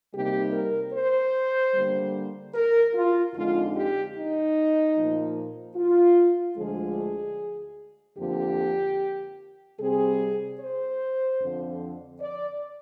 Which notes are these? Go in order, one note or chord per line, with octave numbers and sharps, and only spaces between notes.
C3 G3 A#3 D#4 G4
A#4
C5
D3 G3 A#3
A#4
F4
F2 D3 G#3 D#4 F4
G4
D#4
A#2 F3 A#3
F4
D2 D3 F3 G#3 G#4
F2 D3 F3 A#3 G4
C3 G3 C4 G#4
C5
F2 D3 F3
D5